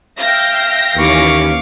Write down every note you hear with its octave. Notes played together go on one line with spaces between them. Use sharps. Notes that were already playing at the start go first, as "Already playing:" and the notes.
E5 F5 G5 A#6
D#2 E3 A#3 C#4 F5 C#6 D6